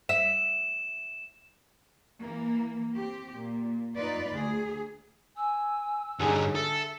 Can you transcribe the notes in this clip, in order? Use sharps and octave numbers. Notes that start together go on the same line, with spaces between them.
E5 E7
E3 A#3
C4 G4
A#2
D#4 F4 B4 D5
D2 G#4
G#5 E6
G2 D3 C#4 D#4 G#4
A4 E5 E6